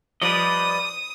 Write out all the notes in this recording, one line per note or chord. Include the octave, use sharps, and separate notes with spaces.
F3 G3 B4 D5 D#5 D#6